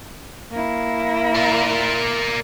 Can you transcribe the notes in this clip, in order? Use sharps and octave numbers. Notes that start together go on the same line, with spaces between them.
A#3 E4
A#4 D5